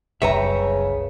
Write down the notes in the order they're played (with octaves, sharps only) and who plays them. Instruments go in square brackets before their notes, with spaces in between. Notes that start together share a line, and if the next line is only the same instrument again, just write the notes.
[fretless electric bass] F#1 C2 [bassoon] C#3 [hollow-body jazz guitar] B4 E5 [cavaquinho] C#5 G5 A#5